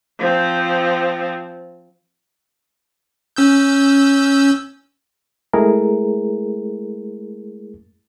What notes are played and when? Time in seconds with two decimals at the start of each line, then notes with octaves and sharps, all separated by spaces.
0.19 F3 C4
3.36 C#4 E6 G6
5.53 G#3 A3 E4 G#4 A#4